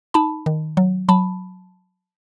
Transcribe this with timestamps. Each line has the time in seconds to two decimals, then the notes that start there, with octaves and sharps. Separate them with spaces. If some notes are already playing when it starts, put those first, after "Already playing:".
0.14 D#4 A5 B5
0.46 D#3
0.77 F#3
1.09 F#3 A5 B5